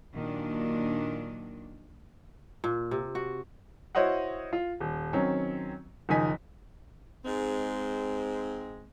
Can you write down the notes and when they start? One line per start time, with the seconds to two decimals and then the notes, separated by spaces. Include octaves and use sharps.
0.14 A#2 D#3 F#3 D4
2.64 A#2
2.91 C3
3.15 F#4
3.95 E4 F#4 C5 C#5 D#5 F#5
4.53 F4
4.80 D#1
5.13 D#3 F#3 C4 C#4
6.09 F#1 D#3 F3 D#4 G#5 B6
7.25 G#2 G#3 C4